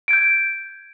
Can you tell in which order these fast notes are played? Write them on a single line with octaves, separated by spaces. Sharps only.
D7 G#6 G6